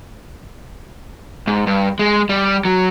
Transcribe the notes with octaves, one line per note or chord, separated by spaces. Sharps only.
G#2
G2
G#3
G3
F#3